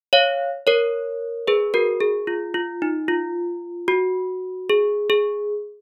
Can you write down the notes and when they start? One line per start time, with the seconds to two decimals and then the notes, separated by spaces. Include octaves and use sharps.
0.13 C#5 F5
0.67 A#4 C#5
1.47 G#4 B4
1.74 F#4 A#4
2.01 G#4
2.27 F4
2.54 F4
2.82 D#4
3.08 F4
3.88 F#4
4.70 G#4
5.10 G#4